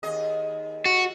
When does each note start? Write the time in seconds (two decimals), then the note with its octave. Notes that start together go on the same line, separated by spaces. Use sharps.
0.03 D#2 G#4 D#5
0.86 F#4